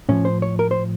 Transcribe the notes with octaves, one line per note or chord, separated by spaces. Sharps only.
A2 F3 C#4
C5
C#5
A#4
C5